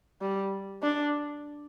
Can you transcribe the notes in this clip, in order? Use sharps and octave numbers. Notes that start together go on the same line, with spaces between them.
G3
D4